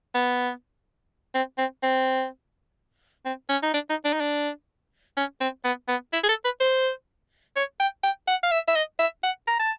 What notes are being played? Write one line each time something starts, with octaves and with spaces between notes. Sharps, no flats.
B3
C4
C4
C4
C4
C#4
D#4
D4
D#4
D4
D#4
D4
C#4
C4
B3
B3
E4
G#4
A4
B4
C5
C#5
G5
G5
F#5
F5
E5
E5
D#5
E5
F#5
A#5
A5